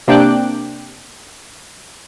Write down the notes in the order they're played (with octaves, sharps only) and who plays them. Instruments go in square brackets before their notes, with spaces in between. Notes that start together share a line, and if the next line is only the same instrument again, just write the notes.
[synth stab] C3 A#3 D4 G5 D6 F#6